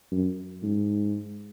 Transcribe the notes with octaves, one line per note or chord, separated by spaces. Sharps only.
F#2
G#2